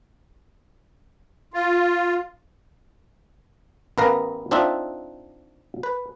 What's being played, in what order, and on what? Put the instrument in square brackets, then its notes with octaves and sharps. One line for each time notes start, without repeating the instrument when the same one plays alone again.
[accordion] F4
[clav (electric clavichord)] A1 B3 A#4 B4 F5
C4 D4 D#4 F4 E5
B4